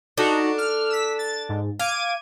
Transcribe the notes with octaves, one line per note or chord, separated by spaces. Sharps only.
D4 D#4 F#4 A4 A#5
F6
E6 B6
A6
G#2
F5 D6 G#6 D#7